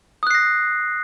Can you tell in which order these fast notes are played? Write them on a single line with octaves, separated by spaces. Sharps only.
D#6 F#6 C7 A#6